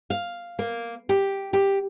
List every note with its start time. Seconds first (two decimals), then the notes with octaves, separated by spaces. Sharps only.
0.10 F5
0.59 A#3
1.09 G4
1.53 G4